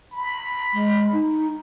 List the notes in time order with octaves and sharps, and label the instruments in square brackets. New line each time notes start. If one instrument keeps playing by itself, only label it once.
[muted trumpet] B5
[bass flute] G#3
D#4